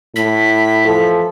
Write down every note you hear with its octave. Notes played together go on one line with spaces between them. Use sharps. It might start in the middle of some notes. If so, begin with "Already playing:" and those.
A2 B6
E3 F3 A4